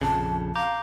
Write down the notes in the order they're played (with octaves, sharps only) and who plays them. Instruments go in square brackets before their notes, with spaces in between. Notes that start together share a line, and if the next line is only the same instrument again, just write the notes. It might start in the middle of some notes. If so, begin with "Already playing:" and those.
[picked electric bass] A#1 F2 C#3 [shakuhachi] A5
[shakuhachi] F5 [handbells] A#5 D6 G6